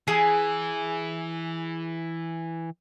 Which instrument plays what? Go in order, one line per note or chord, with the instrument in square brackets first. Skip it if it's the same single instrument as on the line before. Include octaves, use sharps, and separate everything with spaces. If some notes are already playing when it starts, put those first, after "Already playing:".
[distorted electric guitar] E3 [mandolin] G#4